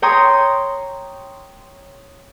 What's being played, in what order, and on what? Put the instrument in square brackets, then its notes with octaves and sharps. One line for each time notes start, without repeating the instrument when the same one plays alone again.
[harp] C#5 G5 A#5 C6 D#6